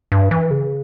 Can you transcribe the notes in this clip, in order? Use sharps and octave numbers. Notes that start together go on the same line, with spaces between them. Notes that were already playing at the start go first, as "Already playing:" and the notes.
G2
E3
C#3